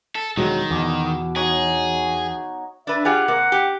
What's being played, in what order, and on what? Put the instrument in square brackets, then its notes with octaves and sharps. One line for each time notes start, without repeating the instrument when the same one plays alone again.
[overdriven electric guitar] A4
[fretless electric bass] E1 F#3 G#3 [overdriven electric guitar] D#3
[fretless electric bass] E2 [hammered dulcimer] B2 G#5 D6
[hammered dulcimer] D#4 F#4 C#5 [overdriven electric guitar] G#4
[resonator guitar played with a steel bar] D4 B4 [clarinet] E5
[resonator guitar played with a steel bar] F4 G4 G#4 [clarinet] F#5
[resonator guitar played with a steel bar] C3 A#3
G4